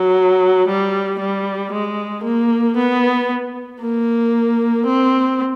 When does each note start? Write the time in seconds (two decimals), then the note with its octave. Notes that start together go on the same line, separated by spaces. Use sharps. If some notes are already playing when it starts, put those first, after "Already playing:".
Already playing: F#3
0.68 G3
1.21 G3
1.72 G#3
2.25 A#3
2.77 B3
3.81 A#3
4.86 C4